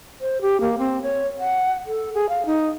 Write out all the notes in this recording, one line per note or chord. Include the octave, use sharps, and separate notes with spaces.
C5
G4
A#3
C4
C#5
F#5
A4
G#4
F5
D#4